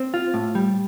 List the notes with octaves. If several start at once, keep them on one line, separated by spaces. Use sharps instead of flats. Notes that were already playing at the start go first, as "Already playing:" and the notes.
Already playing: C4
F4
A2
G3